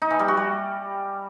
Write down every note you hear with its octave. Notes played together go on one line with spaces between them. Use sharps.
D#4
E3
G3
F#4
G3